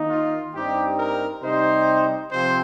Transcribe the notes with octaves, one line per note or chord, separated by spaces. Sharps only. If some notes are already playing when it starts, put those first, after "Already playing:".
Already playing: D#3 A#3 D#4
F4
G2 G3 C4 D#4 G4
A#4
C3 G3 D#4 C5
C3 F3 C4 C5